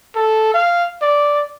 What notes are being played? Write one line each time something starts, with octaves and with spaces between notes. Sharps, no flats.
A4
F5
D5